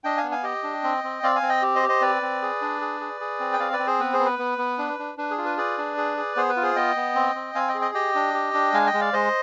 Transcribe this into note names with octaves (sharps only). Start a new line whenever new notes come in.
D4 D#5 G5
F5 G#5
B3
F5 G#5
G4 D#5 G5
D4
C4
C4
C4 D5 F5
F5 G#5
C4
D#5 G5
G4
C5 D#5
G4
C5 D#5
C4 B4 D5
C4
G#4
D4
G#4
G#4
G#4
C4
G5
C4 D5 F5
B4 D5
C4
G#4 C5
B3 B4
G#4 C5
B3
B4
B3
B3
D4
D4
D4 B4
G#4
F4
B4
G#4 B4 D5
D4
G#4
G#4
B3 G#4 C5
B4
F4
G#4 C5
B3 D#5 G5
B3
C4
C4
C4 F5 G#5
D#5 G5
G#4
D#5 G5
G4 D#5 G5
D4
G4
D4
G#3 F5 G#5
D#5 G5
G#3
D5 F5
G#3 C5 D#5